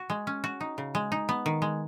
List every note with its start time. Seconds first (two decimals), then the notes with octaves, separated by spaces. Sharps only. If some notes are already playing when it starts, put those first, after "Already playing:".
Already playing: F#4
0.10 G#3
0.27 C#4
0.44 F#4
0.61 D#4
0.78 C#3
0.95 G#3
1.12 D#4
1.29 B3
1.46 D#3
1.62 G#3